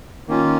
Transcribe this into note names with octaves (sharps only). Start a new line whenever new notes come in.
D#3 A#3 C#4 F4